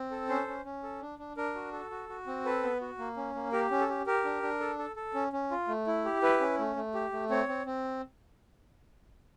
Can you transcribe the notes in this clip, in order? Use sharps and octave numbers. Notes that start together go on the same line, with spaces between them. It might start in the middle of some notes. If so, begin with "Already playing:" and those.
Already playing: C4
A4
C#4 C5
C#4
C#4
A4
D4
D4
D4 A#4
F#4
A4
F#4
F#4
C4
A4 B4
B3
F#4
A#3
C#4
A#3
G4 A#4
C#4
A4
G4
G4 A#4
D4
D4
A4
A4
A4
C#4
C#4
F4
A3
E4
G4
E4 B4
C#4
A3
A3
G4
A3
C4 C#5
C4
C4